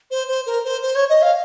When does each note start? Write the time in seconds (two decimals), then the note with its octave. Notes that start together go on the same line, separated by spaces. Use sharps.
0.11 C5
0.28 C5
0.46 A#4
0.65 C5
0.83 C5
0.95 C#5
1.09 D#5
1.22 F5